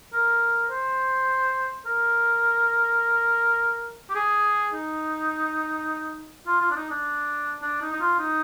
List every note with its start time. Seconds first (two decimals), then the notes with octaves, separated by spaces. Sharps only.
0.13 A#4
0.70 C5
1.86 A#4
4.09 G4
4.16 G#4
4.74 D#4
6.46 F4
6.61 F4
6.70 D4
6.76 D#4
6.90 D4
7.62 D4
7.81 D#4
7.93 D#4
8.01 F4
8.19 D#4